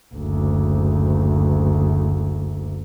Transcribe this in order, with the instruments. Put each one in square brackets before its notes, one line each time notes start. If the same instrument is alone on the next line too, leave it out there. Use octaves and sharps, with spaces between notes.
[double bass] F#1 D2